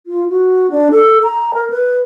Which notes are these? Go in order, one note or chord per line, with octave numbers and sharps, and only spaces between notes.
F4
F#4
D4
A4
A#5
A#4
B4